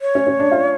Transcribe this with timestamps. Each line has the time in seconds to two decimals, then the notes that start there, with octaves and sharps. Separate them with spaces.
0.01 C#5
0.15 C#4
0.27 C#4
0.40 D4
0.52 F4